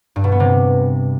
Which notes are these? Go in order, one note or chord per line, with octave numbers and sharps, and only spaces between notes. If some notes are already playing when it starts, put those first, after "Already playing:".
G2
B2
B3
C3